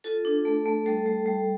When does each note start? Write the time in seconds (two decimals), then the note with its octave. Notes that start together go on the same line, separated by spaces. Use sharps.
0.04 F4 A4
0.25 D4
0.45 A3
0.65 A3
0.86 G3 A4
1.06 G3
1.26 G3